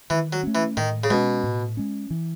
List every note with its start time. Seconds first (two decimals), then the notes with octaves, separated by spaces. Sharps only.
0.10 D#3 E3
0.33 F#3
0.43 A3 C#4
0.55 E3
0.77 A2 D#3
1.04 C#3
1.10 B2 G#3 C#4
1.44 A2
1.77 G#3 C#4
2.10 E3